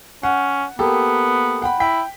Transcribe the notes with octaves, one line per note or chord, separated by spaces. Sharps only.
C#4 F#5
A#3 B3 G4 A4
F#5 G5 B5
E4 G5 B6